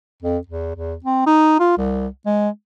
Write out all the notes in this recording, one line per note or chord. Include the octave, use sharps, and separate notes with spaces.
F2
E2
E2
C4
D#4
F4
C2
G#3